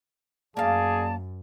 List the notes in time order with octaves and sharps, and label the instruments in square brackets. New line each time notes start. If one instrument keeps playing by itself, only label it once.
[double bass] F#2 [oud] A#3 F5 [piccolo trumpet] G#4 [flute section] D5 A5 A#5